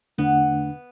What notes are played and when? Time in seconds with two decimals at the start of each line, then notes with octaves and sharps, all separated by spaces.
0.18 E2 D3 A3 B3 D4